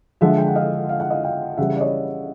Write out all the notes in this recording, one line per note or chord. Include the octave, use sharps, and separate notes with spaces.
D3 F3 G#3 E5 F#5
G5
F#5
D#5 F5
F5
F#5
D#5 F5
F5 G5
C#3 E3 G3 E5 F#5
D5
C#5 D#5